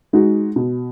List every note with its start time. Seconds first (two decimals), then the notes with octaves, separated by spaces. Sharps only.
0.13 G#3 D#4 F#4
0.56 B2